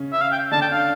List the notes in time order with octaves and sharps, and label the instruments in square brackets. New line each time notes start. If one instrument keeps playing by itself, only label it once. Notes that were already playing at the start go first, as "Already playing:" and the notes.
Already playing: [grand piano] C#3 C#4
[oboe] E5
F5
G5
[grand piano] D3 D4 [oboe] A5
[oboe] G5
F5